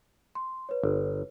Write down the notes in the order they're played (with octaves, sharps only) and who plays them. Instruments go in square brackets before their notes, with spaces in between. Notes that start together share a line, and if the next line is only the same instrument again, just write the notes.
[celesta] C6
B4 C#5
[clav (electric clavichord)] G1